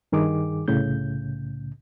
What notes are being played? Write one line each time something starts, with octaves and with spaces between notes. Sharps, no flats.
G2 D#3 G#4 D6
C2 A2 C#3 G6